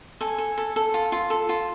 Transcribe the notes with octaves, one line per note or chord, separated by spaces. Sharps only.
A4 G#5
A4
A4
A4
F4
F4
A4
F4